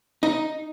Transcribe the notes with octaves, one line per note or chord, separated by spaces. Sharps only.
D#4